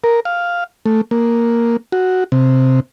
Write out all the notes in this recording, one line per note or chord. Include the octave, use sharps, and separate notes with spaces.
A#4
F5
A3
A#3
F#4
C3